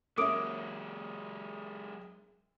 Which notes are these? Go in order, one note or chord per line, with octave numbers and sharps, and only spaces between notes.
F#3 G#3 A#3 C#4 E5 D6 D#6 D7